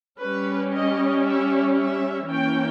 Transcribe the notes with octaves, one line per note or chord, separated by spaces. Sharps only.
G3 C#4 B4
D#5
E5
E5
E3 A#3 C#4 G5